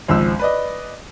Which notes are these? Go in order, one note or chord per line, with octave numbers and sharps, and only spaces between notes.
G#1 C#2 F3 E6
B4 D5 D#5